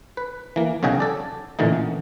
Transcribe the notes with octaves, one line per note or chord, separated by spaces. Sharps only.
B4
E3 A#3
B1 C#3 F#4 D#5 G5 G#5
A4 D5
A1 A#2 D3 E3 D#4